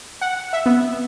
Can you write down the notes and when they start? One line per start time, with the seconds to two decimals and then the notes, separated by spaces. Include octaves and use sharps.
0.21 F#5
0.53 E5
0.66 B3